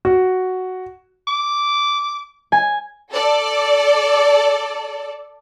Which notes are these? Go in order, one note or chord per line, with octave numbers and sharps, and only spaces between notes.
F#4
D6
G#5
A4 D5